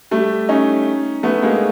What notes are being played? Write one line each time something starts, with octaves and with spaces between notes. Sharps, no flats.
G3 A3
C#4 D#4
A3 B3
G#3 A#3